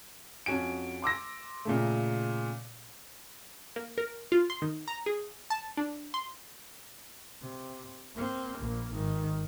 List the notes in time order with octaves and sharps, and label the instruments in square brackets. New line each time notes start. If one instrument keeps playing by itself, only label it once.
[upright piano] F2 C#4 F#4 G#5 D7
C6 D6 E6 A#6
A#2 C#3 A3
[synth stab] A#3
A#4
F4
C6
D#3
A#5
G#4
A5
D4
C6
[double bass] C3
A#3 C4
A#1 A#3
G#1 D#3